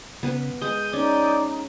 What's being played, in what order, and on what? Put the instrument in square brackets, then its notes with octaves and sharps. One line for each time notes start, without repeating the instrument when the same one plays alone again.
[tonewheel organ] C#3 [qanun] B3 B4
[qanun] G#3 F#5 [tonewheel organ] D#6 G6
[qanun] C#4 [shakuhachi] D#4 [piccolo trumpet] D5